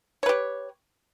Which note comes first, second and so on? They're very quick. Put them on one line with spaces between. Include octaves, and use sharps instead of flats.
C#5 B4 G4